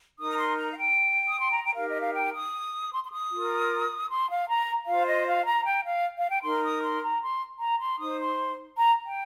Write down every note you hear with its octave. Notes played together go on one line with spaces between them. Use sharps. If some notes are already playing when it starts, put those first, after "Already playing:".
D#4 A#4 D#6
A#5
C6
A#5
F5
G5
D#6
C6
A#5
G5
D#4 G4 A#4 F5
D#5
F5
G5
D#6
C6
C6
D#6
F4 A#4
C6
F5
A#5
F4 C5 F5
D#5
F5
A#5
G5
F5
F5
G5
D#4 A#4 C6
D#6
C6
A#5
C6
A#5
C6
D#4 C5 D#6
C6
A#5
G5